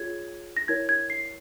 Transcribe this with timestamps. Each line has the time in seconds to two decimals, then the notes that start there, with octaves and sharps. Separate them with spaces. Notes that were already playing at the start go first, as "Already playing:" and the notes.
Already playing: F4 G#4 C#5 G#6
0.57 A#6
0.68 E4 A#4 C#5 G#6
0.89 G#6
1.10 C7